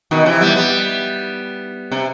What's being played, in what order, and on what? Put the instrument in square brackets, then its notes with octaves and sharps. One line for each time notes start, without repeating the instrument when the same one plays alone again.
[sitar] B2 D#3
C3 E3
G3 B3
G3 B3
C3